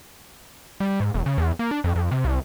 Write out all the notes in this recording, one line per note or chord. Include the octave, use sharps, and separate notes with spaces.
G3
G#2
E1
C#3
E2
A#3
D4
F2
F2
C3
C2